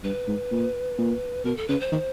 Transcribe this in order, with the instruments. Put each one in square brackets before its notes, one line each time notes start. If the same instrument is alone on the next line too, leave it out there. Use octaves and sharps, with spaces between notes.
[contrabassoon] G2 [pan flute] B4
[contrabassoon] G#2
A#2
A#2
[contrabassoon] B2 [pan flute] A#4
[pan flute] A4
[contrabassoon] C#3 [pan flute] B4
[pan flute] C5
[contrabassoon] D#3